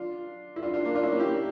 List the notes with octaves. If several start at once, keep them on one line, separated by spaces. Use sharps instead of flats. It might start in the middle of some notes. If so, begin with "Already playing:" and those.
Already playing: D4 F4
E4
D4 F4
D4 F4
A#3 D4
D4 F4
C#4 E4
A#3 D4
E4 G4